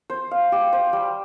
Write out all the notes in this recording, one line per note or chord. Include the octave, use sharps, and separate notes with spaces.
C5
F5
G4
C5
G3